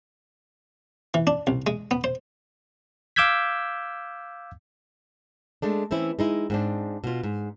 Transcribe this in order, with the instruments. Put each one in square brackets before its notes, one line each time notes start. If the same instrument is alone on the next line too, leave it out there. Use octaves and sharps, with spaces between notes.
[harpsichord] E3
D4
C2
G#3
B3
C5
[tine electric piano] F5 D6 E6 G6 G#6 B6
[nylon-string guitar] G#3 A3 D4
E3 C4 C#4 E4
G#3 D#4 E4
G#2 C4 D4
B2 F4
G#2